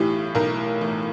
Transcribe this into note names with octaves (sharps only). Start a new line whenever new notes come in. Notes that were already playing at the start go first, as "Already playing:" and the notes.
Already playing: B1 A2 E3 G4
B1 A#4
A2 E3